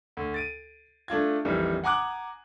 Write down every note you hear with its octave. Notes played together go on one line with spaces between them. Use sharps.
D2
A6 D7 D#7
A3 D4 F4 G#6
A#1 F2 D#3 E3 G3
F#5 G#5 A#5 D6 D#6 F#6